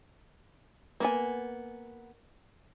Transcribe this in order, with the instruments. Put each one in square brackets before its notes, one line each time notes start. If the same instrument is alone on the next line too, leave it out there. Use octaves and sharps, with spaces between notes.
[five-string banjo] A#3 B3 G#5